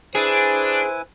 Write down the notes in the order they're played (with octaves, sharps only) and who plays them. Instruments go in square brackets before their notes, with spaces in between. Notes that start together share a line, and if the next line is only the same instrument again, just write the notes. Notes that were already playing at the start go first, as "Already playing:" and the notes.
[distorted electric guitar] D4 [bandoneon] E4 B4 G#5 [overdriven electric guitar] G#4 [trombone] C5